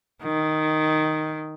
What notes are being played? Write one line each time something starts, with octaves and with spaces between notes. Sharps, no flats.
D#3